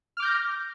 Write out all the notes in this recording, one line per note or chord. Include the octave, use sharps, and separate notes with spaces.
D6 F6 G6 A#6